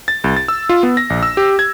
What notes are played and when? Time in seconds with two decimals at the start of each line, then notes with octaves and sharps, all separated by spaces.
0.08 A6
0.24 C2
0.36 A6
0.48 E6
0.69 F4
0.83 B3
0.97 A#6
1.10 A#1
1.23 E6
1.37 G4
1.59 G#6